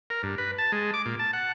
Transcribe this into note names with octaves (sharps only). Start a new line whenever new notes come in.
A#4
G2
B4
A5
G#3
D6
A#2
A5
F#5